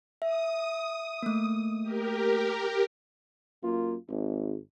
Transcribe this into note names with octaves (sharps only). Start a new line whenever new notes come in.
E5 D#6
A3 A#3
G4 A#4
F#2 A#3 F4
G#1